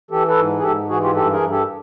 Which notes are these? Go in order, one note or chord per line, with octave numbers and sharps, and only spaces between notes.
E3 G4 A4
A4 B4
G#2
G#4
G#2 G4 A4
E3 F#4 G#4
F4 G4
G2 G4 A4
G#4 A#4
G2
G4 A4